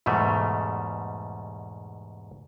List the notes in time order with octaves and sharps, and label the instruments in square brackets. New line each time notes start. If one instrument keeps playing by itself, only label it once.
[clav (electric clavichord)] E2 G#2 B2 G3 A3